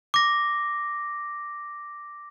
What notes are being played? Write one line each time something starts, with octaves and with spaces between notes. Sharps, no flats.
D6 A#6